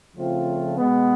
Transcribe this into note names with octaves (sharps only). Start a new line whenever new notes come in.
C#3 F3 A3 C4 F4
B2 G#3 B3